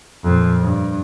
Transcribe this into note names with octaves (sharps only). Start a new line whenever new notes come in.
F2 A#2
G2